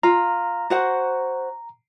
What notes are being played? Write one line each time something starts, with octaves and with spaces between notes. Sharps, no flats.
F4 F5 A#5
F#4 C5 F#5